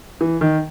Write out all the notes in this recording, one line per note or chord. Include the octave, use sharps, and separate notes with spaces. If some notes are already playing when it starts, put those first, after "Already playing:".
E3
D#3